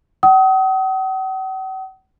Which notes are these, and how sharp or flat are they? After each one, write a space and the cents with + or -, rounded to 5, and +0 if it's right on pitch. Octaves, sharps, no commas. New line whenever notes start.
F#5 +45 D#6 +30